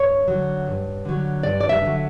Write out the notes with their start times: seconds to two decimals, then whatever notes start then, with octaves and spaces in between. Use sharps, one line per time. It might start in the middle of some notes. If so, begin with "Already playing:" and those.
Already playing: G2 C#5
0.28 D3 F#3
0.67 G2
1.05 D3 F#3
1.43 G2 D5
1.61 D5
1.69 E5
1.82 D3 F#3